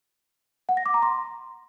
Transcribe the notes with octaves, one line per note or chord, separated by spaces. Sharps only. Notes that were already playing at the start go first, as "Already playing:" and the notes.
F#5
A#6
D6
A#5
C6